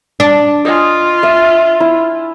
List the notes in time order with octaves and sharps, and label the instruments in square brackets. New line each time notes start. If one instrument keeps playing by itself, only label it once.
[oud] D4
[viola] F4 [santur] D#5 G#5
[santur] E5
E4